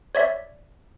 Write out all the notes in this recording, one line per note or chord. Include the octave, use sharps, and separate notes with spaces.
C#5 D5 E5